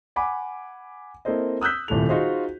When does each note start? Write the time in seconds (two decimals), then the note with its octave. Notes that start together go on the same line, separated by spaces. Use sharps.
0.16 F#5 G#5 B5 D6
1.25 A#3 C4 E4 A4 C5 D#5
1.61 D#6 E6 F#6 G6 B6
1.88 D#1 A2 C3 A4 F7
2.09 D#4 F4 F#4 G#4 C5 D#5